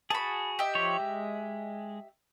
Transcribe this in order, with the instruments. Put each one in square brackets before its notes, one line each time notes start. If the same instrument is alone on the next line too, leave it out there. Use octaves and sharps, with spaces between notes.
[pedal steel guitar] F#4 G#4 [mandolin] A5 B5
[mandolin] G4 D#5 E5
[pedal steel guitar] F3 C#5
G#3